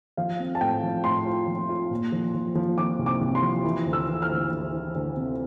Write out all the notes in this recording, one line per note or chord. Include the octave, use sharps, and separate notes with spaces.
F3 F5
C4
A5
A2 G5
F3
A2 C6
F4
F3
F4
A#2
F3
F3
F3
F3 D6
C2
D6
C2
C6
F3
E3
D2
E6
E3
F6
D2
D2
E3
D2
C3